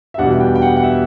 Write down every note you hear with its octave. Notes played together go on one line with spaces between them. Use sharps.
E5
E2 B2 G3 B3 D4 F#5
G5
G5
F#5
F#5
E5